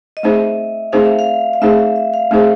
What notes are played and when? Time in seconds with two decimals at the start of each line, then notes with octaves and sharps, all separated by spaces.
0.17 D#5
0.23 A3 C4 D#4 G#4 C5 E5
0.92 A3 C4 D#4 G#4 C5 F5
1.05 E5
1.19 F5
1.53 F5
1.62 A3 C4 D#4 G#4 C5 E5
1.96 E5
2.14 F5
2.31 A3 C4 D#4 G#4 C5 E5